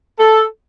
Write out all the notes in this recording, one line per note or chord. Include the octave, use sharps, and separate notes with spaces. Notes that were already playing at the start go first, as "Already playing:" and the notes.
A4